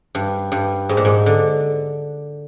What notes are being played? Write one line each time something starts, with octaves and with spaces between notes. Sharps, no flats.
G2
G2
G#2
A#2
G#2
D3